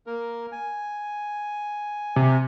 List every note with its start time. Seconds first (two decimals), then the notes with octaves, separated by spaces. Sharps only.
0.07 A#3 A#4
0.52 G#5
2.16 C3